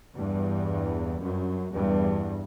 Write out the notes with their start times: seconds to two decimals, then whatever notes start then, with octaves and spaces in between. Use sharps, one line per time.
0.16 E2 G2
1.22 F#2
1.74 E2 G2